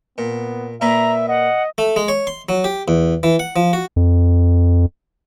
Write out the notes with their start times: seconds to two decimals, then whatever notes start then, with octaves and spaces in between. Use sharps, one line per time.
0.18 A#2 B3
0.81 A#2 A#3 B4 E5 A#5
1.28 D#5 F#5
1.78 A3
1.96 G#3
2.08 C#5
2.27 C6
2.49 F#3
2.64 G4
2.88 E2
3.23 E3
3.39 F#5
3.56 F3
3.73 F#4
3.96 F2